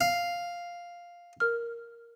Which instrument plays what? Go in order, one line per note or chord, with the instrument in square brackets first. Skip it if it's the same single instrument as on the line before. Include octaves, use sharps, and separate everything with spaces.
[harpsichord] F5
[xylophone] A#4 F6